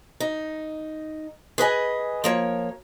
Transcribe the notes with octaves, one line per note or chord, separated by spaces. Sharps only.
D#4
G#4 B4 D#5 G#5
F3 A#3 C#5